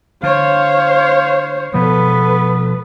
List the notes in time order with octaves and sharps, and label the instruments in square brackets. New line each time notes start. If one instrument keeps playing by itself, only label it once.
[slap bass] D3 [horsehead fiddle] C5 C#5 [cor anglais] F5
[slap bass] B2 F3 G#3 [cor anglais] B3 [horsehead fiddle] A4 B4